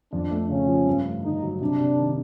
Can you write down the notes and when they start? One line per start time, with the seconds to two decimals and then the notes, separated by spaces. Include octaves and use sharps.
0.13 F2 D4
0.31 A3
0.49 C#3 C#4
0.68 F3
0.87 G2
1.05 A3
1.23 D3 D#4
1.43 F#3
1.61 C3 D4
1.80 C3
1.98 D#3